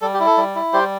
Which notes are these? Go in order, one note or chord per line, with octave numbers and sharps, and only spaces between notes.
G3 A4
G4
E4
A4
G3
E4
G3 G4 C5